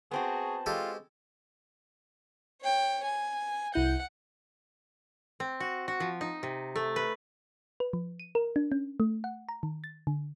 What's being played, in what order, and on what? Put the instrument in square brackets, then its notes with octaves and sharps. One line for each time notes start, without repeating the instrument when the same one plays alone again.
[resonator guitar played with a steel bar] B3 C4 F#4 [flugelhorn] G#4 [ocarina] A5
[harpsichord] G#3 G4 A4 [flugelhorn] F4
[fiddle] C#5 G5
G#5
[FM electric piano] C2 E4 G6 [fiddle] F#5
[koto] C4
F#4
F#4
F3
D#4
C3
A3
B4
[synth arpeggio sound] B4
F3
D#7
A#4
D4
C#4
A3
F#5
A#5
D#3
A6
D3